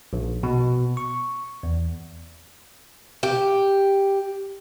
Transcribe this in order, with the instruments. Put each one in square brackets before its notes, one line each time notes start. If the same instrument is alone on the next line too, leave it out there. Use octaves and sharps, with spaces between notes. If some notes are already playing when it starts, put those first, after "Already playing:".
[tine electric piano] A#1
B2
C#6
E2
[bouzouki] G4